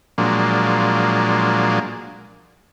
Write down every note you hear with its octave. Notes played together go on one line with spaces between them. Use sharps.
A#2 F3 F#3 G#3 A#3 D4